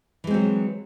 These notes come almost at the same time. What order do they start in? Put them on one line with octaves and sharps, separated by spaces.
E3 G#3 C4 F#3